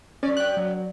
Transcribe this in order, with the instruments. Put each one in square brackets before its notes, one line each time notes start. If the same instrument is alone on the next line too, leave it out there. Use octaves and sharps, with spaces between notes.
[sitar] F#2 D5 [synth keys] C#4
[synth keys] G5 F#6
F#3